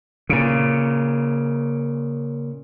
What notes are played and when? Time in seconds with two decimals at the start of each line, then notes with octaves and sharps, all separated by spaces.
0.29 A#2 C#3